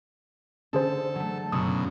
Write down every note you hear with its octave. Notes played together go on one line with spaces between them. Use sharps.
D3 C#4 G#4 A4 C5
F#3 A3
F#1 F#2 B2 D#6 E6